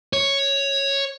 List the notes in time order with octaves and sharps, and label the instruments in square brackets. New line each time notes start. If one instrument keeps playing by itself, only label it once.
[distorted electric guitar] C#5